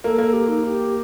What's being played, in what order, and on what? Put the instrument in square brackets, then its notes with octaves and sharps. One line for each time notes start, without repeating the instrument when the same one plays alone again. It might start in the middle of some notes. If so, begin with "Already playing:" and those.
[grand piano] A#3 [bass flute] A4
[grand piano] A#3
[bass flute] G4
D#4
G4